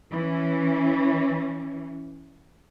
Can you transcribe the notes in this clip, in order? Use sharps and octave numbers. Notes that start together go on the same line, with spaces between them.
E3 C#4